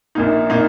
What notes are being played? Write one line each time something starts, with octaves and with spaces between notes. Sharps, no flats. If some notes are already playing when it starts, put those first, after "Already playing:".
A#1 A#2 A#3 D#4
A#2 A#3 D#4